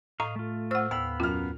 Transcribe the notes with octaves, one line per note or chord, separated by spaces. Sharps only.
A2 D#5 F5 A#5
A3 F4
A2 C5 F#5 E6 F6
D#2 B3 F5 B5 E6
F#2 F4 F6